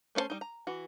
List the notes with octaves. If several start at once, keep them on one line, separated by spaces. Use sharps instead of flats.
A3 C#4 F4 C5 A5
G3 D#4
A#5
E3 F#4